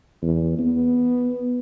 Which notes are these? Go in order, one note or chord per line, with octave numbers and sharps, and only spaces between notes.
E2
B3